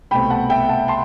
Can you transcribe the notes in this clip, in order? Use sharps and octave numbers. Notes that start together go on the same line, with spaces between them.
C2 B2 A3 C4 G5 B5
F#5 A5
E5 G5
F#5 A5
A5 C6